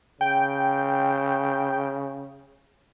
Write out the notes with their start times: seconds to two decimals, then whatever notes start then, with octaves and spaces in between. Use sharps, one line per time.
0.21 C#3 G5